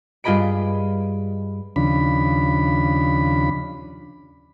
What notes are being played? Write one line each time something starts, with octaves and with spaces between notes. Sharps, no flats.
G2 F4 G#4 D#5 B5 D7
D#2 C#3 F3 D4 B5